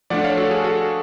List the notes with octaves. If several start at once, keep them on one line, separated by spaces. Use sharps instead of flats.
F3 A3 D4 D5 F#5
C#5 F5
F#4 A4
G#4
F#4 A4